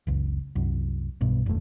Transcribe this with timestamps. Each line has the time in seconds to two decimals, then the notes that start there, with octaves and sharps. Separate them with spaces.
0.07 F#1 C#2
0.55 C2 F#2
1.21 B1 G2 B2
1.46 F#1 D#2 A3